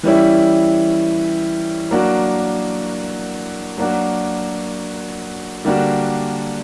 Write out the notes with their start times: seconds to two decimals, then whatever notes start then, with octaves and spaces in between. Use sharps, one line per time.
0.03 E3 G3 C#4 E4
1.91 F#3 A#3 D4 F#4
3.78 F#3 A#3 D4 F#4
5.65 D3 G3 A#3 D4 F#4